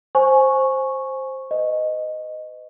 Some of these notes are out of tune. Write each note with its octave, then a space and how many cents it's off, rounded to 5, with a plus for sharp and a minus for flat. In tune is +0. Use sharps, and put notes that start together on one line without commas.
C5 +10 G#5 +15 C#6 -5
B4 +40 D#5 -5